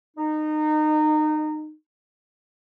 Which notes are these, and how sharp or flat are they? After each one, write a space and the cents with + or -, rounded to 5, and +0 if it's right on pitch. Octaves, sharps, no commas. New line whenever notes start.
D#4 -25